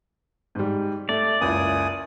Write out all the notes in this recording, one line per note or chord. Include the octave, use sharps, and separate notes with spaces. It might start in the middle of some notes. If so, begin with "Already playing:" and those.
G#2 G3
A3 D5
F#1 C#2 E4 G#5 D#6